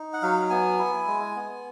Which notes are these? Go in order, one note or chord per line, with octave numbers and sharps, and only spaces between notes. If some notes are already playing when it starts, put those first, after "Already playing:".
Already playing: D#4
F#5
F#3 F5
B3 G#5
E4
G#3
B3